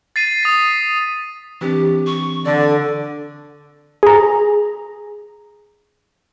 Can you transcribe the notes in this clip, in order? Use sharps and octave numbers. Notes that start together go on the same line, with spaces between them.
A6 C7 D#7
D#6 B6
E3 C4 D4 G4
C#6
D3 D5
G#4 A#5